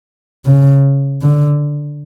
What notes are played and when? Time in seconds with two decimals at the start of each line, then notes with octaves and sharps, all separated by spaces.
0.45 C#3
1.22 D3